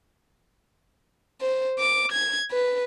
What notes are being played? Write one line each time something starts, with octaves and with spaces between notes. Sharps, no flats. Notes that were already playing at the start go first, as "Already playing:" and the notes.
C5
D6
G#6
B4